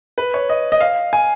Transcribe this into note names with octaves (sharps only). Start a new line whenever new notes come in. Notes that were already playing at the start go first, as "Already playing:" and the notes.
B4
C#5
D#5
D#5
F5
G#5